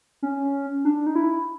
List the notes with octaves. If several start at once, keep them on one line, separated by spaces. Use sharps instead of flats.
C#4
D4
D#4
E4